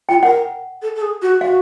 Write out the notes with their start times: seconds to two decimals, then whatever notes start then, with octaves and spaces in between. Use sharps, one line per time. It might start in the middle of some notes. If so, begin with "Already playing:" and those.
0.09 F4 G5
0.23 A#4 F#5
0.82 A4
0.95 A4
1.01 G#4
1.22 F#4
1.41 F#4 F5